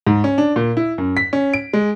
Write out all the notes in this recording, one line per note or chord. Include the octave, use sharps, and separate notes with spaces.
G#2
C#4
D4
A#2
E4
F#2
B6
C#4
D7
G#3